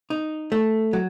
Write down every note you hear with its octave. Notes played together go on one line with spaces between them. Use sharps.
D#4
A3
F#3